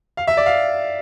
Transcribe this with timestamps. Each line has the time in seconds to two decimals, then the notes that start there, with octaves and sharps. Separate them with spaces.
0.17 F5
0.27 E5
0.37 D5
0.46 F5